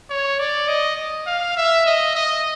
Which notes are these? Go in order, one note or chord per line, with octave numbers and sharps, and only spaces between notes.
C#5
D5
D#5
F5
E5
D#5
D#5